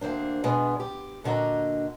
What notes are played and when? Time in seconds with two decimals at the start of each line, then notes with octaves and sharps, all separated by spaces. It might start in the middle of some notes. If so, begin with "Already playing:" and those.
0.01 D2 A#3 C4 D4
0.44 B2 G#3 B3 D4
0.80 G4
1.24 A#2 D3 F#4 D#5 A#5